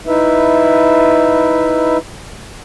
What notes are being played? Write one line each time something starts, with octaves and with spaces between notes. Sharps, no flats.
D#4 E4 B4 E5